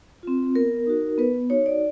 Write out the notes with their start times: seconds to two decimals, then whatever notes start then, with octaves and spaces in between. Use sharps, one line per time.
0.23 C4 F4
0.55 B3 A#4
0.87 D#4 F#4
1.18 B3 B4
1.49 D#4 F#4 C#5
1.66 D5